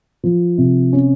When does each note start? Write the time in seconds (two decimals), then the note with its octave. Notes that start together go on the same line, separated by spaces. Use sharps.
0.23 F3
0.58 C3
0.93 C#4